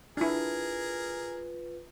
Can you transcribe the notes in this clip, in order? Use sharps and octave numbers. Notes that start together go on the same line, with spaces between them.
D4 E4 F4 G#4 A#4 B4